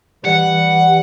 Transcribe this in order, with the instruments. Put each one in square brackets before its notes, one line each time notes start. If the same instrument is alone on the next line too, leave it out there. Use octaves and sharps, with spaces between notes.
[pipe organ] E3 [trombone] G3 [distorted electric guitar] F#5